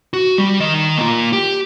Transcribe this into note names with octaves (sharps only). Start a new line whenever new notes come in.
F#4
G3
D#3 D#5
A#3 F4
G4